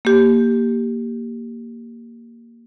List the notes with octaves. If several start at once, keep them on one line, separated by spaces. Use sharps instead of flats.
A#3 G4